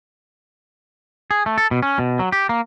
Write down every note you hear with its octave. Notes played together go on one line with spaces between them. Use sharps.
G#4
A3
A4
B2
C#4
B2
F#3
G4
A#3